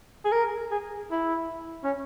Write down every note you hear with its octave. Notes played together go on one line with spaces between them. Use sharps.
G#4
A#4
G#4
E4
C#4